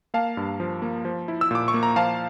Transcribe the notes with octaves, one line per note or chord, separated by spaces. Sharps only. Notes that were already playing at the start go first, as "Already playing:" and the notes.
A#3 F5 A5
G2
F3
A#3
F3
E4
E6
A#2 D6
C#6
A#3
A#5
F3 F5 A5